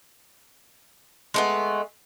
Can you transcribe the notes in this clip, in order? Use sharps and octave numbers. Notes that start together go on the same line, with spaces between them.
G#3 A3 B3